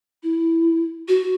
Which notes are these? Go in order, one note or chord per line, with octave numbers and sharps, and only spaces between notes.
E4
F#4